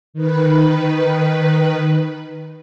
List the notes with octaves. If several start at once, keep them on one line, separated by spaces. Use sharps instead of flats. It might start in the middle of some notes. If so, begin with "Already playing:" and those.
D#3 B4